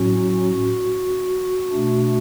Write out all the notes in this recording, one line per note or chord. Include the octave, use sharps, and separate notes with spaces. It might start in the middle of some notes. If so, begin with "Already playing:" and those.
Already playing: A2 F#3 C#4 F#4
B2 A3 D4